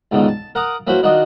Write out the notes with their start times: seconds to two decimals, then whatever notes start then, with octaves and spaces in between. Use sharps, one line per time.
0.12 C#2 G#2 B2 D3 D#3
0.28 A5
0.55 A#4 F5 F#5 A#5 D6 D#6
0.87 A#3 C#4 E4 F#4 B4 C5
1.03 D#3 D4 D#4 F4 F#4 D#5